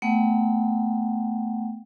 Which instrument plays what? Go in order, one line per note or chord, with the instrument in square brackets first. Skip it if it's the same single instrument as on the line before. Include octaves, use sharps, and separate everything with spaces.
[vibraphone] A3 B3 F#5 G5